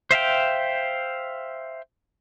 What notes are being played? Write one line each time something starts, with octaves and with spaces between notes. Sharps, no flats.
C5 E5 F5 G5